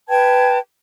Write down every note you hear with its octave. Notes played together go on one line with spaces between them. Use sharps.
B4 G5 A5 G#6